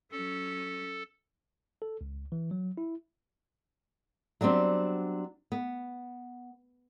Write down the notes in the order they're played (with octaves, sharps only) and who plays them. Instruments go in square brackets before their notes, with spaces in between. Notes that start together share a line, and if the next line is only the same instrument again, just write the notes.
[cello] F#3 C#4 [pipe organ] A4
[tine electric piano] A4
C#2
E3
F#3
E4
[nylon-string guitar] F#3 G3 B3 C4 D4
B3